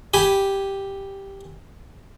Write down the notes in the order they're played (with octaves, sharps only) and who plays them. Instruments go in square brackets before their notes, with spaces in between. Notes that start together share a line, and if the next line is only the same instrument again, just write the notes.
[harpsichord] G4 G#5 B5